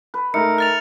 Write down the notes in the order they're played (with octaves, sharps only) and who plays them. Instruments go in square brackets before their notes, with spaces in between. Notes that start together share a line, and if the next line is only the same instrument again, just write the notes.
[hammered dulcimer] B4
[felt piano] A3 D#4 [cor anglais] A#4 [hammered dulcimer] E5 [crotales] C#7
[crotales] F6 A6 F7